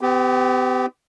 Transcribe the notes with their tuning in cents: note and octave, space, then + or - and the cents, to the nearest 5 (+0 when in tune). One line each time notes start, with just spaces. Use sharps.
B3 +45 G4 +0